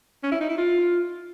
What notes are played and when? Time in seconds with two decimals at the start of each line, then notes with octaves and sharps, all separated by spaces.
0.23 C#4
0.32 E4
0.41 D#4
0.49 E4
0.58 F4